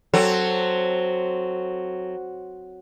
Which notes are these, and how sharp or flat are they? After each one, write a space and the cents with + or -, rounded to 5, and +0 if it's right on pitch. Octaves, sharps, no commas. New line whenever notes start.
F#3 +0 C4 +0 A4 +15